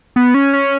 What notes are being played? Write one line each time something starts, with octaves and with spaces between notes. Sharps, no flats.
B3
C#4
C#4